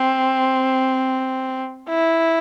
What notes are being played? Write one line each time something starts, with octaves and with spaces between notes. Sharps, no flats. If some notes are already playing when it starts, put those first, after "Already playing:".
Already playing: C4
E4